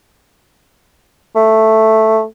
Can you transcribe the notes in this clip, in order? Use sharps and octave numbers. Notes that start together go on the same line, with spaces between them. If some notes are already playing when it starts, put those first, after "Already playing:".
A3